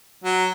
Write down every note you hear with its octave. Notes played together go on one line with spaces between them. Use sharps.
F#3